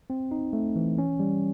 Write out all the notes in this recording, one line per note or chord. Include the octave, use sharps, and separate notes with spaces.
C4
D#4
A3
E3
C#4
G3